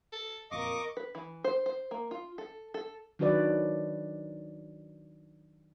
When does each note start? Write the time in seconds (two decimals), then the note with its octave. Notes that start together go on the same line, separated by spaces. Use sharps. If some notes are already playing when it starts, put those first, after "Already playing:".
0.12 A4
0.51 F#1 F2 A#2 A#4 D#5 F5 C#6 D6
0.97 B4
1.15 E3
1.44 C5
1.66 C5
1.91 A#3
2.11 F4
2.38 A4
2.74 A4
3.19 D#3 F#3 D4 F#4 B4 D5